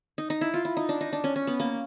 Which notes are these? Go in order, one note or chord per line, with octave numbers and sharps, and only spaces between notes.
D#4
D#4
E4
F4
E4
D#4
D4
D#4
D4
C#4
C#4
B3
A#3